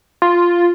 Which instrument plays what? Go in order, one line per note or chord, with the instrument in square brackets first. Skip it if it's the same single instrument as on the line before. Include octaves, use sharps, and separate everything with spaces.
[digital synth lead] F4